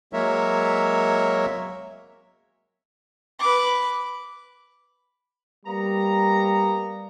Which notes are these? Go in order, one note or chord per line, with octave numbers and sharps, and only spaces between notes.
F#3 G#3 A#3 A#4 C#5 E5
B4 D6
G3 A#3 B3 A#5